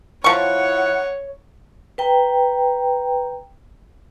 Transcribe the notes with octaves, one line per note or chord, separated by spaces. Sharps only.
F3 E4 C#5 F#5 C#6
B4 G5 A#5